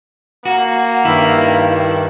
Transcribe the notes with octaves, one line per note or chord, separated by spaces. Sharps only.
A#3 F#4
G2 D#3 E4